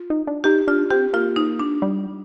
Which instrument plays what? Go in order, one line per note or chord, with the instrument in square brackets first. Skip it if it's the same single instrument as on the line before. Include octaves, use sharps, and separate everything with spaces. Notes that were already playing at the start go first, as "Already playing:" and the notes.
Already playing: [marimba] F4
[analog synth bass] D#4
D4
[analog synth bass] D#4 [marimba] G4
[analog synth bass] D4 [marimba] F4
[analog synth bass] C4 [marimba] G4
[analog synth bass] A#3 [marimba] F4
[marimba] D#4
D4
[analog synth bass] G3